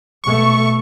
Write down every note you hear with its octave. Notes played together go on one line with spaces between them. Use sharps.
B2 A3 C#6